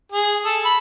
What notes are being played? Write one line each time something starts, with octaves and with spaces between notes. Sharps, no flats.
G#4
A4
B5